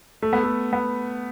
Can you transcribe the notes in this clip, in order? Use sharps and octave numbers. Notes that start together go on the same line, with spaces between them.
A3
B3
A3
B3